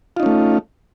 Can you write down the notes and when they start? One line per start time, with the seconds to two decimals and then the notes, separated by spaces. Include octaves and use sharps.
0.17 F4
0.20 D#4
0.23 C#4
0.26 A3